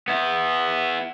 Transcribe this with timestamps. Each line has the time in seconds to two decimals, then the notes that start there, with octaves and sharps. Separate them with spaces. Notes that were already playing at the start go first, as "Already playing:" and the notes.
0.08 B3 E4